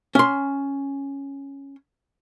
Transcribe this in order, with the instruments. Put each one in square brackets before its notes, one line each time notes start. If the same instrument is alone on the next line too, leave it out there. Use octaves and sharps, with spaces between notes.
[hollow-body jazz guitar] C#4 C6